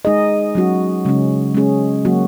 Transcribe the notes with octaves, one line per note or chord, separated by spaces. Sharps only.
G#3 D#4 G#4 D#5
F#3 C#4 F#4
C#3 G#3 C#4
G#3 C#4 G#4
F#3 A#3 F#4